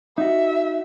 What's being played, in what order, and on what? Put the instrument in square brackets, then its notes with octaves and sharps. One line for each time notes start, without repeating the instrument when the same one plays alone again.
[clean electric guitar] D#4 F#4 [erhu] E5